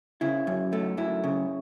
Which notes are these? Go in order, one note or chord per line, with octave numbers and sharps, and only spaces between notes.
C#3 E4
F#2
A3
F#2 E4
C#3